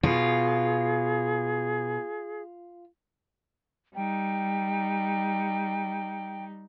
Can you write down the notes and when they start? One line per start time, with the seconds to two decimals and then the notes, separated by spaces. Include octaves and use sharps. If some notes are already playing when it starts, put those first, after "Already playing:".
0.03 B2 F4 G#4
3.95 G3 D#4 G5